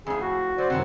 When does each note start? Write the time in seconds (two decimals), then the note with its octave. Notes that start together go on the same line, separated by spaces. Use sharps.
0.07 F2 A2 G#4
0.21 F#4
0.58 F#3 C5 D5
0.70 F#2 C3 D#3 E3 C4 F#5